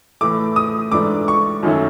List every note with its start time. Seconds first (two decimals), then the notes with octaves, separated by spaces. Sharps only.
0.21 A2 E3 A3 D6
0.56 D#6
0.92 G#2 E3 A3 D4 D6
1.28 C#6
1.63 F#2 D#3 F#3 A3 C#4